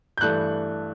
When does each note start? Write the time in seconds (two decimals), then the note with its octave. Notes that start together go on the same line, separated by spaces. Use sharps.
0.18 G6
0.21 G2 E3 A3 D4 F#6